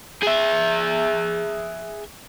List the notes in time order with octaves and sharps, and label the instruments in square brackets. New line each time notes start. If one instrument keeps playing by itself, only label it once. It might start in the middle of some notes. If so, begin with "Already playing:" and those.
[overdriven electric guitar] G#4 E5